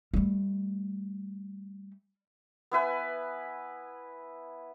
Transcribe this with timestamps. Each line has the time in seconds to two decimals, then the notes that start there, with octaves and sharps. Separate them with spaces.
0.14 G3 A3
2.71 B3 E4 B4 G#5